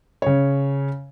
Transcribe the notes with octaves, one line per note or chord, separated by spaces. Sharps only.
C#3 C#5